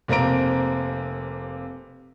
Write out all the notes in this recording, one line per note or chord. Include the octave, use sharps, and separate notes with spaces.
F1 C3 A#3 C4 A#5 D7